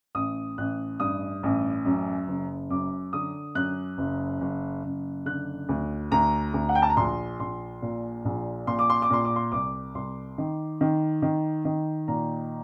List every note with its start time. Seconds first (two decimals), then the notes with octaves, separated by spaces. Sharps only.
0.15 A1 D#6
0.58 A1 F#6
1.00 G2 D#6
1.43 A1
1.85 F#2
2.28 F#1
2.70 F#2 D6
3.13 D3 D#6
3.55 F#2 F#6
3.98 F#1
4.41 F#1
4.84 F#1
5.26 D3 F#6
5.69 D2
6.11 D2 A#5
6.54 D2
6.69 F#5
6.75 G5
6.82 A5
6.90 A#5
6.97 A#1 C6
7.40 A#1 C6
7.82 A#2
8.25 A#1
8.67 A#2 C6
8.79 D6
8.90 C6
9.02 D6
9.10 A#2 C6
9.25 D6
9.36 C6
9.52 C2 D6
9.95 C2 C6
10.38 D#3
10.81 D#3
11.22 D#3
11.65 D#3
12.08 A#2 A#5